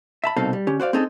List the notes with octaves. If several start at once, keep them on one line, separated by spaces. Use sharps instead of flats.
E5 A5 B5
C2 B2 C4 D#4 A4 F5
G3
D3 C#4 G4
F#4 C5 D5 F5
C4 C#4 D#4 G#4 A4